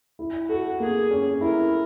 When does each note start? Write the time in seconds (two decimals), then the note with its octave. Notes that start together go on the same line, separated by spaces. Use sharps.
0.19 E4
0.49 F#4 A4
0.80 A#3 G#4
1.11 C#4
1.41 E4 A#4